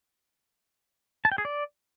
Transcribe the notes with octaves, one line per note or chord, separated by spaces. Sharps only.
A5
G5
G#4
D5